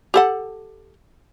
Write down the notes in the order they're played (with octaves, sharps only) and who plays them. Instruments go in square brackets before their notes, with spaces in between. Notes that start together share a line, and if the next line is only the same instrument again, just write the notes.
[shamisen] G4 A4 F#5